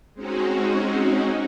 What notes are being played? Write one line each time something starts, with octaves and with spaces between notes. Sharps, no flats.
G#3 C4 C#4 D#4 F#4